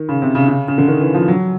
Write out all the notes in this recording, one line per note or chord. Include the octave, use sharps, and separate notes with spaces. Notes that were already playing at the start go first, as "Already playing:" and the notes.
Already playing: D#3
C#3
C3
C#3
C#3
C#3
D3
D#3
E3
F3
F#3